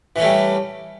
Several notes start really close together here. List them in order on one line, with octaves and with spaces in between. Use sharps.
E3 C#4 A3 G3